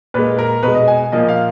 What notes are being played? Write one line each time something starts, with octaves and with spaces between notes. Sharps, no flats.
A#2 G#3 B4
A#4
B2 G#3 B4
D#5
G#5
A#2 F3 A#3 D#5
F5